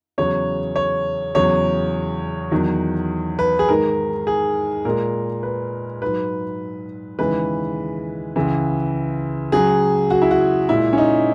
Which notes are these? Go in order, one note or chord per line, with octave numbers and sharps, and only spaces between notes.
E2 C#3 F#3 C#5
C#5
E2 C#3 F#3 C#5
E2 D#3 F#3
B4
G#4
G#2 D#3 G#3 A#4
G#4
A#2 G#3 A#4
B4
G#2 F#3 B4
D#2 C#3 E3 G#3 B4
C#2 C#3 E3
C#2 C#3 F#3 G#4
F#4
E4
F#4
A#2 G#3 E4
C#4
D#4